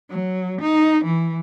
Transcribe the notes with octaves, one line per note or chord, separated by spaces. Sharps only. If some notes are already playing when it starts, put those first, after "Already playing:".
F#3
D#4
E3